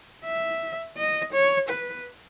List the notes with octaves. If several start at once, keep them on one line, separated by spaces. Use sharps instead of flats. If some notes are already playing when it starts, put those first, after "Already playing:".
E5
D#5
C#5
B4